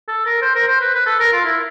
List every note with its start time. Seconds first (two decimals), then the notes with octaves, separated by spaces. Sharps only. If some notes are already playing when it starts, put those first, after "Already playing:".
0.08 A4
0.26 A#4
0.42 C5
0.55 A#4
0.68 C5
0.81 B4
0.95 B4
1.06 A4
1.20 A#4
1.33 F4
1.45 E4